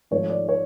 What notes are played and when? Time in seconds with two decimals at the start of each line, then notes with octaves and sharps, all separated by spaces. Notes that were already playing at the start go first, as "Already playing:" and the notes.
0.11 G#1 G#2 F3 A3 C#5
0.30 D5
0.49 C#5